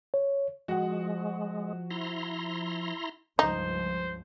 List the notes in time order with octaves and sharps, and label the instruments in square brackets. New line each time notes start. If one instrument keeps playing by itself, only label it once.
[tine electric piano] C#5
[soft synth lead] F3 [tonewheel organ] G#3 [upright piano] F#4 F#5
[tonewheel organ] E4 A#5 C6
[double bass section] C#2 G2 F3 [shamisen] D#4 [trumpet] C5